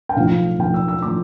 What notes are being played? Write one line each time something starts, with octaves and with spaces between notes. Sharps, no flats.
G5
B1 A2 F3 F5
B1 A2 F3 G5
E6
E6
A2 F3 D6